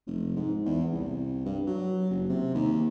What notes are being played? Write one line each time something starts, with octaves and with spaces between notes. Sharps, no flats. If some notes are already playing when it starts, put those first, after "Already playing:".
F1
G#2
E2
C2
G2
F#3
F#1
C3
D#2